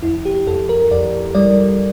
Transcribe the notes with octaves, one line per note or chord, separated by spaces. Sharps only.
F2 E4
G4
F2 A4
A#4
F2 D5
G3 D5